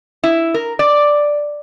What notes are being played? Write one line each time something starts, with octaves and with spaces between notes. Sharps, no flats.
E4
A#4
D5